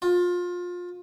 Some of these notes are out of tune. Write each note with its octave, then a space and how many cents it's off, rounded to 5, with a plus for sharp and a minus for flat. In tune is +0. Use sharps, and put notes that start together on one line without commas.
F4 +25